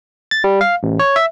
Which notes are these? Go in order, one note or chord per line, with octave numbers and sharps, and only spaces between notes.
A6
G3
F5
A1
C#5
E5